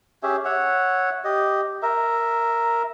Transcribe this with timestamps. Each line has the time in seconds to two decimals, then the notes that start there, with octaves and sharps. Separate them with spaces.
0.23 C#4 G4 G#4 E5
0.45 C#5 E5 F#5
1.24 G4 D#5
1.82 A#4 E5